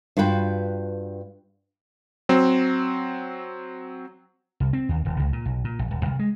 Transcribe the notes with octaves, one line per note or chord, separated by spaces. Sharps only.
G2 F4 F#4 B4 G5
F#3 C4
C2
C4
D#2
D#1
C#2
A#2
B1
A#2
A#1
D#1
C2
G#3